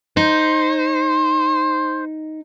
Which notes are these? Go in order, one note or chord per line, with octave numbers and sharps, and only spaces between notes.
D#4 C5